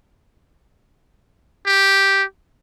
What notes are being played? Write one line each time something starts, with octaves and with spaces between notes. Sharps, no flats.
G4